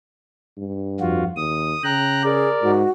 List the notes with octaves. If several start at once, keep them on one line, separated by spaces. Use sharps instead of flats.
G2
F2 F4 F#4
D#2 D#6
C#3 G5 A#5 F#6
G#4 A#4 D5
G#2 F#4